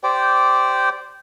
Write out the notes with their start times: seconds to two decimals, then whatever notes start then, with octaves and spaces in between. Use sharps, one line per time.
0.04 G4 C5 D5 G5